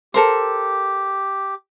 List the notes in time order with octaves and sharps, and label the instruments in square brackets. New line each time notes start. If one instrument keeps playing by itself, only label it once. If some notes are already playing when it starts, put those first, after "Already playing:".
[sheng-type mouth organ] G4 [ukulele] A4 A#4 C5